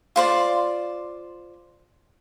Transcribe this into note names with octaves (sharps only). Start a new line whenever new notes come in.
F4 C5 D5